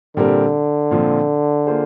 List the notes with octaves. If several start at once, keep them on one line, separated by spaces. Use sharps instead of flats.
A#2 D3 G3 C4 G4 A#4
A#2 F3 C4
A#3 F4 G#4 C5